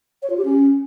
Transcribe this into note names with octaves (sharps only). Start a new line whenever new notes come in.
C#5
F4
G4
C#4